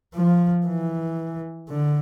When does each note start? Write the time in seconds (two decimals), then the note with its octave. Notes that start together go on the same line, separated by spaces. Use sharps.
0.14 F3
0.66 E3
1.69 D3